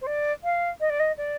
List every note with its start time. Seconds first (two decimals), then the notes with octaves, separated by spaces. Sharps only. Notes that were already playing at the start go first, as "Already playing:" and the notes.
0.01 C5
0.06 D5
0.44 F5
0.80 D#5
0.89 D5
0.99 D#5
1.17 D5